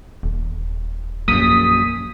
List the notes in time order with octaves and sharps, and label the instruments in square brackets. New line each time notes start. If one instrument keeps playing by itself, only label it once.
[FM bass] D#1
[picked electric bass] A#1 F#2 [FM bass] A#3 [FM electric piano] D#6 B6